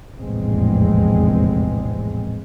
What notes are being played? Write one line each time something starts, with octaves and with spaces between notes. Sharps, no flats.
F1 A#1 E2 A2 G#3 C4